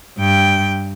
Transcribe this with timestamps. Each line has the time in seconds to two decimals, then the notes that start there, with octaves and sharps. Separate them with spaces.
0.18 G2 G5